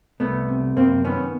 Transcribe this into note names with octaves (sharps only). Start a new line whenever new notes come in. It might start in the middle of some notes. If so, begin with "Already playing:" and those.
C2 A3 B3
C3
F#2 A#3 C4
D#3 B3 C#4